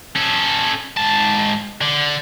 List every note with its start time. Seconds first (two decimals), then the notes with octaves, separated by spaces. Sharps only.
0.15 C#4 A4
0.97 G#2 A5
1.81 D3